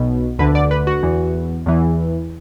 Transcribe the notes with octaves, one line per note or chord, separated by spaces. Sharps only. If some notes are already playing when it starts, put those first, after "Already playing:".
Already playing: B1 B2
D2 D3 B4
D5
B4
F#4
E2 E3
E2 E3